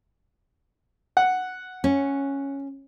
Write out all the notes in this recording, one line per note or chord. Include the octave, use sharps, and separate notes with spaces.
F#5
C#4